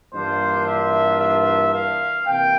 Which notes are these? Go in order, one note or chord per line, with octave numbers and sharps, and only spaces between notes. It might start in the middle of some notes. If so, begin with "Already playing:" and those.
G2 E3 A#3 D4 F4 C5
E5
E5
F5
C3 E3 A#3 G5